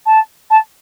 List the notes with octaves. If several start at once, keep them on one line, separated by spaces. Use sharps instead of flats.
A5
A5